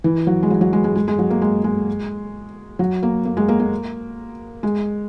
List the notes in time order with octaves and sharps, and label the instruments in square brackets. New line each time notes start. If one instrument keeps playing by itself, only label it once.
[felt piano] E3
F#3
G#3
F#3
F#3
G#3
G#3
G#3
G#3
F#3
A#3
G#3
G#3
F#3
A#3
A#3
G#3
A#3
A#3
G#3